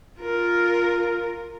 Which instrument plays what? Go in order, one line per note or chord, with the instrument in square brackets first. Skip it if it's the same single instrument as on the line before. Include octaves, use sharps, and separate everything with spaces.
[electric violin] F4 A#4